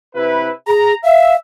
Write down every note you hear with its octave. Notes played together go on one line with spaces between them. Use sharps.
C3 E4 B4
G#4 A#5
E5 F5